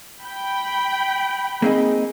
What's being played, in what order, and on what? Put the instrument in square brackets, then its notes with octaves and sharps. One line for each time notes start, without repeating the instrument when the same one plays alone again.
[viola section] G5 B5
[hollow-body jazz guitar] A#3 C4 D#4 [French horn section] G#4